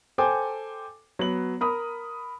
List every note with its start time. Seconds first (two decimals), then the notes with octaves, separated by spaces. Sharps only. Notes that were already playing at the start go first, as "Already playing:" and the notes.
0.18 A4 C5 G5 G#5 D6
1.19 F#3 B3 F#7
1.61 A#4 B5 D#6